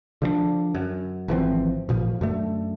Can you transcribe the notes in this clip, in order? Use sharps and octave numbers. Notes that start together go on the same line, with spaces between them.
D3 F3 A3 D4
F#2
G#1 E3 F3 C4
A1 A#2 F3
F#2 D3 A3